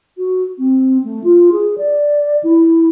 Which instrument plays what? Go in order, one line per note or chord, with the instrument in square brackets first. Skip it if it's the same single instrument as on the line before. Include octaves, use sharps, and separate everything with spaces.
[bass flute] F#4
C4
A3
F4
G#4
D5
E4